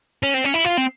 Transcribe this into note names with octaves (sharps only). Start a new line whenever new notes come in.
C#4
C4
C#4
E4
F4
C4